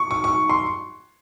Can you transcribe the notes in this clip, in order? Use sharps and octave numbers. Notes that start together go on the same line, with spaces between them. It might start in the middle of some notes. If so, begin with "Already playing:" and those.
Already playing: C#6
C#6
C#6
C6